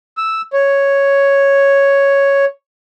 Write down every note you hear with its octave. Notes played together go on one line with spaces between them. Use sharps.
E6
C#5